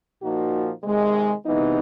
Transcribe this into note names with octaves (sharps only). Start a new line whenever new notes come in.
A#2 F3 A#3 D#4 F#4
C3 D#3 G#3
C3 E3 G#3 B3 D#4